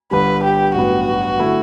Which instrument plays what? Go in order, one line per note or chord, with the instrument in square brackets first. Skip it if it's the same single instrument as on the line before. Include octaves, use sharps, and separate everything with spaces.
[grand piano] G1 G2 D3 G3 [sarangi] B4
[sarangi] G4
[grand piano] A1 G2 F#3 B3 [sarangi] F#4
[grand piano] D3 F#3 A3 E4